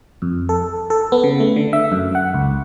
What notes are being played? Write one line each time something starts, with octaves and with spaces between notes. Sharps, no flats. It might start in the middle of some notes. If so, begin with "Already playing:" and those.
F2
A4
A4
B3
C#3
A3
D3
E5
F#2
F#5
C#2